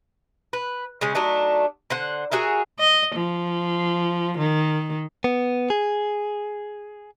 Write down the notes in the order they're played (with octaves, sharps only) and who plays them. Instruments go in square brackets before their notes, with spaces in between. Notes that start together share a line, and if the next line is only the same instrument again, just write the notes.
[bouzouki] B4
C#3 G#3 C#4
F#3 A3 D4 D#4
D3 C5 F#5
F#4 G#4 A#4 E5
[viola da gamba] D#5
F3
D#3
[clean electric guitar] B3
G#4